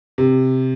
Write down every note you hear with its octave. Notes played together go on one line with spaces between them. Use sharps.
C3